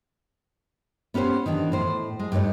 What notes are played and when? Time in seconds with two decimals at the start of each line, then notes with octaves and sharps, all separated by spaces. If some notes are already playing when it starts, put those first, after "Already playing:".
1.14 B3 C#4 G4 A#4 C5
1.46 D#3 E3 D4
1.72 A2 C5
2.19 G#3
2.32 G2 A3 D#4 C#5